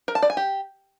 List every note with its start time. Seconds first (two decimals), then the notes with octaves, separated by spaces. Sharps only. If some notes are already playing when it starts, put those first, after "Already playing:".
0.08 A#4
0.15 A5
0.22 D5
0.30 G#5
0.37 G4